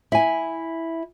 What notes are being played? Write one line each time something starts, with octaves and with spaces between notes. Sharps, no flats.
E4 G#5